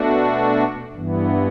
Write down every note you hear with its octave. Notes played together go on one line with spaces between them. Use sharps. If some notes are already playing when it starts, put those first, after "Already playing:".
Already playing: B2 A3 D4 F#4
G2 E3 B3